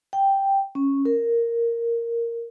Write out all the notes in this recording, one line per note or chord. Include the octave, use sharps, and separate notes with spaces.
G5
C#4
A#4